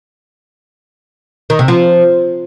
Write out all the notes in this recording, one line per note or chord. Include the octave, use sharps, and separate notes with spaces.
D#3
C3
F3